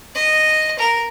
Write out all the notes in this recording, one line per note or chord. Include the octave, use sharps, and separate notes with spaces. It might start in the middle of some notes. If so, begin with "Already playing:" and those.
D#5
A#4